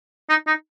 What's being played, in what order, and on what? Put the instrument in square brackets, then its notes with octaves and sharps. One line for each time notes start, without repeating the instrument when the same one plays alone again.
[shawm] D#4
D#4